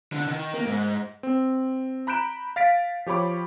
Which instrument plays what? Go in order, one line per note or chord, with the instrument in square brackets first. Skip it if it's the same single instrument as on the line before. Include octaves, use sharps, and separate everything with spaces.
[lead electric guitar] D3
D#3
A#3
G#2
[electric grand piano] C4
A#5 B5 F#6 G6 D7 E7
F5 A6 B6 D7
F3 G4 C#5 B5 D6